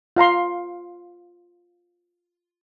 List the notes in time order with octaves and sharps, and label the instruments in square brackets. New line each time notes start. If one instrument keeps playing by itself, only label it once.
[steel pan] F4 F5 A#5 C6